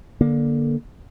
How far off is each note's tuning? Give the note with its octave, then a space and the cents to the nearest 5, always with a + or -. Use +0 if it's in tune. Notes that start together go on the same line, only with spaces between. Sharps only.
D3 +0 A#3 +20